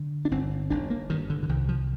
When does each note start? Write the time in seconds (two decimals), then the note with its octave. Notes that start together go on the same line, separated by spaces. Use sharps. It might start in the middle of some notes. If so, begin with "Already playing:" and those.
Already playing: D3
0.25 D4
0.31 G1 C4
0.70 G1 D4
0.90 A#3
1.10 G2 D#3
1.30 D3
1.43 D3
1.49 C2 D#3
1.69 F3